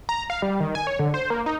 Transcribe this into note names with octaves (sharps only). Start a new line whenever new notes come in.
A#5
F5
G3
D#3
G#5
C#5
D3
C5
A#3
D#4